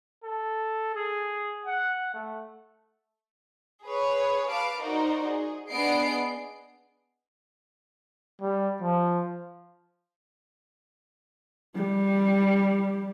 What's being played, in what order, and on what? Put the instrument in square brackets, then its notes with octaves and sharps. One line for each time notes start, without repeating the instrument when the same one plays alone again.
[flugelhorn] A4
G#4
F#5
A3
[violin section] G#4 B4 C#5
B4 F5 A5 D6 D7
D#4 F#4 A#4 C5 D5
G#4
B3 D4 G#4 D#5 C7 D7
[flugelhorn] G3
F3
[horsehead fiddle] G3